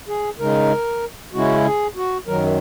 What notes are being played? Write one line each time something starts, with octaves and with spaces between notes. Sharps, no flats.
G#4
C#3 G#3 D#4 A#4
C#3 G#3 C#4 E4 F#4
G#4
F#4
F#2 D#3 F#3 A#4